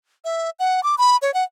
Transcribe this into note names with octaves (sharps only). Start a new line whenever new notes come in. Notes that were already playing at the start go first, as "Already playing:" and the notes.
E5
F#5
D6
B5
C#5
F#5